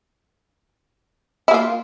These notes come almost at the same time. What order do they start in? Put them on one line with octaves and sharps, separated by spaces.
E4 A#3 F4